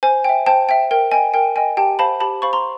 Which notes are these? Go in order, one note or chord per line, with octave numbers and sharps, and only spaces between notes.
C5 G#5
E5 G5
C5 G5 A5
E5 G5
A#4 G5
D#5 G5 G#5
A#4 G5
D#5 G5 G#5
G4 G5 A5
C5 F5 A5 B5
G4 A5 B5
C5 F5 B5 C#6
A#5 C6